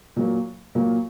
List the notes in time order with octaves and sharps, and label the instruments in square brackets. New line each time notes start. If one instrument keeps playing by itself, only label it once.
[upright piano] A#2 F#3 A#3
A#2 F#3 A#3